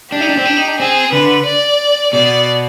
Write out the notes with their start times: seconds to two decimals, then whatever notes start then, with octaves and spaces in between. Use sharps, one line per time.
0.12 D4 G4
0.21 D#4
0.29 D4
0.37 C4
0.46 D4
0.57 D#4
0.68 D4
0.80 C4 G#4
1.12 D3 B4
1.46 D5
2.13 B2 D5